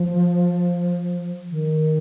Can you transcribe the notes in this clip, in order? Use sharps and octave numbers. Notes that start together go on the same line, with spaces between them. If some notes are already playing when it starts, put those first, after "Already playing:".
Already playing: F3
D#3